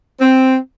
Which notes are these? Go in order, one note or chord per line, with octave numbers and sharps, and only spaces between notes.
C4